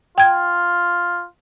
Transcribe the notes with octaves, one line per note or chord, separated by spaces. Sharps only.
F4 G5 G#6